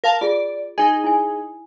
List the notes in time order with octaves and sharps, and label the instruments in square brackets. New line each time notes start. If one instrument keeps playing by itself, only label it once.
[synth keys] A#4 F5 A5
[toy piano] F4 G#4 [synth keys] D5
[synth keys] D#4 G#4 [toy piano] A#4 D#5 G#5
[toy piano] E4 G#5